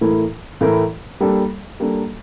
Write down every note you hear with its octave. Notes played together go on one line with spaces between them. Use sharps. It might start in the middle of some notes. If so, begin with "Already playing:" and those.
A2 E3 A3 E4 A#4
A2 E3 A3 E4 A#4
G3 A#3 D4 A4
G3 A#3 D4 A4